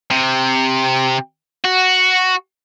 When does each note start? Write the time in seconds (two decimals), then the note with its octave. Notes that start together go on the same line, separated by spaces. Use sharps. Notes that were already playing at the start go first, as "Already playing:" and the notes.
0.11 C3
1.65 F#4